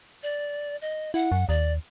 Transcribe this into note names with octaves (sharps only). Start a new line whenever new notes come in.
D5
D#5
E4 F#5
F#2
D#2 D5